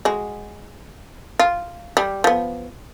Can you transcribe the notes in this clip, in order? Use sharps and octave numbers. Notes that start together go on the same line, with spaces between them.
G#3 F#4
F4
G3
F3 B3